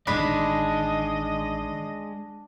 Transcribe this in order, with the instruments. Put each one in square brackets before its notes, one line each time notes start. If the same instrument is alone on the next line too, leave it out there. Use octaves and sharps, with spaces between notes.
[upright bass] A1 D#3 [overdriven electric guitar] G#3 [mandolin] D4 B5 [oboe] D#5